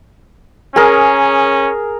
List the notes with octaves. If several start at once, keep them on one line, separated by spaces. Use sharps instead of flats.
C#4 G#4 A#4